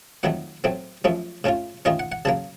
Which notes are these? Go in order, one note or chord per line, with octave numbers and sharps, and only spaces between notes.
F2 D#3 F#3 A3 F#5
A2 F#3 A3 C4
F#2 F3 A3 C#4
A2 A3 C#4 F4
D#3 A3 C#4 F4 D#5
F#5
F#5
C#3 F#3 A#3 A5